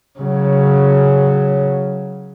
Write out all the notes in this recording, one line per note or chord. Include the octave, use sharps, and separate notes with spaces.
C#3 F#3